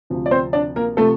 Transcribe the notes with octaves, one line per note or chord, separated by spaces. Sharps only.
D2 C3 F3
D5
C4 C5
D4 D5
A#3 A#4
C3 F3 A3 A4